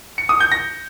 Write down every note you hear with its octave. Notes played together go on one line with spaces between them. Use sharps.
C#7
D#6
G6
A#6